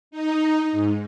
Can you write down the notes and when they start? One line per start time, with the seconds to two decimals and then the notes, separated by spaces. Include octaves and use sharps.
0.11 D#4
0.72 G#2